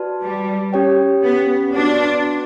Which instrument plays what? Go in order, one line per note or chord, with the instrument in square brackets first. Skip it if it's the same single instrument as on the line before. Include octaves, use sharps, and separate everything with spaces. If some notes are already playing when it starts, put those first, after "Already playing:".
Already playing: [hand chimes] F#4 B4 D5 A5
[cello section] G3
[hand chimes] C#4 G4 C#5 G5
[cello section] B3
[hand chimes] B3 F#4 B4 D5 F#5 [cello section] D4